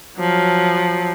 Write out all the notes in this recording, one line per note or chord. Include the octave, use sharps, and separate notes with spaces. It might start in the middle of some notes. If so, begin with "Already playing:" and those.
F3 F#3